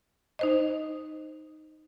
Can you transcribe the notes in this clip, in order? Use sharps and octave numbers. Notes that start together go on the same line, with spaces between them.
D#4 C5 D#5